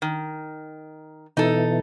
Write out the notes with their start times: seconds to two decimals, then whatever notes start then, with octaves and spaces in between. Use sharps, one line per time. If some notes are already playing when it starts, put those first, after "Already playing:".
0.02 D#3
1.37 B2 E3 D#4 A4